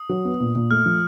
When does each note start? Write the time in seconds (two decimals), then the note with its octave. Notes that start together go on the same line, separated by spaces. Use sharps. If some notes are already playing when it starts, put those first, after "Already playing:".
Already playing: D#6
0.09 F#3
0.25 B3
0.40 A#2
0.55 A#2
0.71 A3 F6
0.86 F3